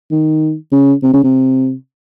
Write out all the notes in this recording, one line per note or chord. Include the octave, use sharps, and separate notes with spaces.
D#3
C#3
C3
C#3
C3